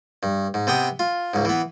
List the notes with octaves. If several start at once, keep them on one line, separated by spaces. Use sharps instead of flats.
G2
G#2
C3 B3 G5 D#6
F4
C#2 G#2
E3 B3